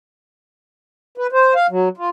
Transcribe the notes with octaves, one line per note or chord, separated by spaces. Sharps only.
B4
C5
F5
F#3
F4